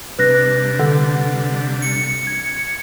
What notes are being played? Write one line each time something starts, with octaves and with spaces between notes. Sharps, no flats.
C3 G3 D4 B4 F#6 A#6
D3
C#7
G#6